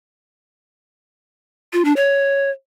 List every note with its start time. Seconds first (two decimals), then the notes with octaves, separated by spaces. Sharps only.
1.73 F4
1.85 D4
1.97 C#5